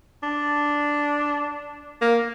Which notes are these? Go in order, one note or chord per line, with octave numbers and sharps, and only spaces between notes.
D4
A#3